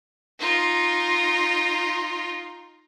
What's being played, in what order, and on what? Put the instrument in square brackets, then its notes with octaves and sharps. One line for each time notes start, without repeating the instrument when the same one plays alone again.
[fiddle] D#4 F4